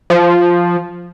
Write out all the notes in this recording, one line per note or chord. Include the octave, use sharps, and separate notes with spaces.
F3